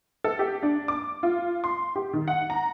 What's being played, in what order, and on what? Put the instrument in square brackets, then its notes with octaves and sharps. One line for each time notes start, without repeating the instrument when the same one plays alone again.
[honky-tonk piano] A4
G4
D4
D6
F4
C6
G4
D#3
F#5
A#5